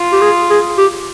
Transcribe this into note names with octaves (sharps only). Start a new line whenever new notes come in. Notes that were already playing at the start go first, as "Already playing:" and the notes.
Already playing: F4
G4
G#4
G#4
G4